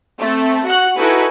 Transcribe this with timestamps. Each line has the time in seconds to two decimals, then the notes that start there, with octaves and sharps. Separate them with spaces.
0.20 A3 C4
0.66 F#4 F#5 F#6
0.98 D#4 E4 F#4 A4 B4 G#5